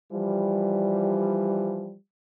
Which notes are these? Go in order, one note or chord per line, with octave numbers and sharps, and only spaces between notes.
E3 F3 G3